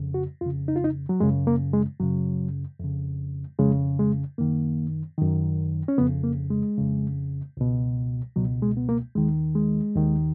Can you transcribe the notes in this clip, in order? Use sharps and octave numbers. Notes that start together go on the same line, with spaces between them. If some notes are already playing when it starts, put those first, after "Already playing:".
Already playing: F2 C#3
F#4
F2 C#3 F4
D#4
F4
D#4
F#3
F#2 C#3 G#3
A#3
G#3
F#2 C#3 F#3
F2 C#3
F2 C#3 G#3
G#3
F#2 D#3 A#3
F#2 D#3
C#4
F2 C#3 B3
A#3
G#3
F2 C#3
C#2 B2
C#2 B2 F#3
G#3
B3
A#3
D#2 D#3 G#3
G#3
D#2 D#3